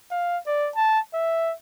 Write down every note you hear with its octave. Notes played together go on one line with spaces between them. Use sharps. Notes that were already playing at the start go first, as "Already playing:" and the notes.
F5
D5
A5
E5